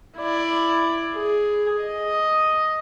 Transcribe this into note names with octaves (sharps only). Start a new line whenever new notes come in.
E4 D5
G#4
D#5